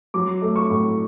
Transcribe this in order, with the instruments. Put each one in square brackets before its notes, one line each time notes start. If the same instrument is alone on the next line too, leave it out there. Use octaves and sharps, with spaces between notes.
[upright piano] F#3 D6
A3
C#6
A2